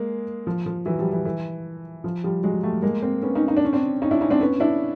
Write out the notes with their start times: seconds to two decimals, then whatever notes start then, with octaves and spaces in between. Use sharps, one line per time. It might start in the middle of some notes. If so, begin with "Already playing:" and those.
Already playing: G#3 A#3
0.47 F3
0.66 F3
0.85 E3 F#3
0.99 F3 G3
1.12 E3
1.25 E3
2.04 F3
2.24 F3 G3
2.44 F#3 G#3
2.63 G3 A3
2.82 G#3 A#3
3.03 A#3 C4
3.22 B3 C#4
3.35 C#4 D#4
3.48 D#4
3.57 D4
3.65 C#4
3.73 C4 D4
4.02 C#4 D#4
4.11 D4 E4
4.21 C#4 D#4
4.30 C4 D4
4.41 B3 C#4
4.60 D4 E4